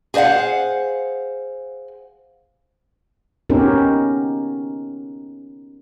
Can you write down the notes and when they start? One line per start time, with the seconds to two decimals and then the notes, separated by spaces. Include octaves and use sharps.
0.14 G#4 C5 D5 F5 F#5
3.50 B3 C#4 D#4 G4 A#4